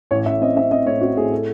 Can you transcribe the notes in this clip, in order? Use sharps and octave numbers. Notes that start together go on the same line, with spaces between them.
A1 C#5
A1 E5
C4 D#5
C4 E5
C4 D#5
A2 C#5
C4 F#4
A2 G#4
A4